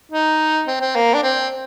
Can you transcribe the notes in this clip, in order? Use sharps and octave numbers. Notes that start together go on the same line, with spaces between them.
D#4
C4
C4
A#3
D4
C4